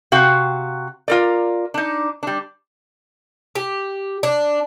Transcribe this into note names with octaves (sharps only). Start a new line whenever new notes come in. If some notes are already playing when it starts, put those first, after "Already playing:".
C3 F#4 F5 G5
F4 A#4 D5
D4 D#4
G3 D4
G4
D4